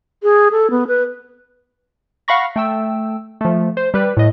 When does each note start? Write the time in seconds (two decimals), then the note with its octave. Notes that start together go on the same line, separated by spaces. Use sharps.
0.23 G#4
0.52 A4
0.71 B3
0.87 B4
2.28 F5 F#5 B5 C#6 A#6
2.56 A3 G5 E6
3.41 F3 A3
3.77 C5
3.94 G3 B4
4.17 A2 D#5